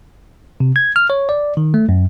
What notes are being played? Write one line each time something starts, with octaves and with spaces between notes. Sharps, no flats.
C3
G#6
F6
C#5
D5
D#3
A3
F#2